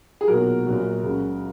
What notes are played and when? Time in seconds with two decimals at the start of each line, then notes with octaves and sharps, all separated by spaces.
0.21 G#4
0.28 B1 A#2 F#3 F#4 A#4
0.66 A#1 A#2 F#3
1.03 C#2 C#3 F#3